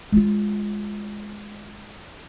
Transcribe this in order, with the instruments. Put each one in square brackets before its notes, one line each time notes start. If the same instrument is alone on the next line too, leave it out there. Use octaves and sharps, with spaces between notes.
[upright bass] G#3 F4